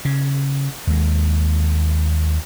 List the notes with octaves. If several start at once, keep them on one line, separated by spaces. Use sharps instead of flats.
C#3
D#2 G#3